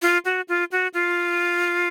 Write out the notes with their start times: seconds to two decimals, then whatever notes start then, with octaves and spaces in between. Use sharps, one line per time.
0.02 F4
0.25 F#4
0.48 F4
0.72 F#4
0.94 F4